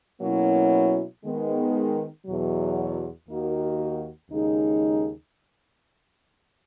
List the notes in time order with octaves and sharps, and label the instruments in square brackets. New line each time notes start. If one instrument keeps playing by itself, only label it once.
[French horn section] B2 F#3 A#3 C#4 E4
D#3 G#3 B3
E2 B2 F#3
D#2 D#3 A#3 D#4 F#4
D#2 C#3 G#3 D#4 G#4